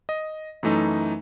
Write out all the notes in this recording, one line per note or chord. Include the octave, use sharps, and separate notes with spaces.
D#5
F#2 E3 A3 D#4